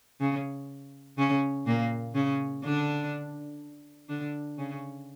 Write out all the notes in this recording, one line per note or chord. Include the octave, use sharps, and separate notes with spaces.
C#3 C#4
C#3 C#4
A#2 A#3
C#3 C#4
D3 D4
D3 D4
C#3 C#4